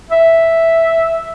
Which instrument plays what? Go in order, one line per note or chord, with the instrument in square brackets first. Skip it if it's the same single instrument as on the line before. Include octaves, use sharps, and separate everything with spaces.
[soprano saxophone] E5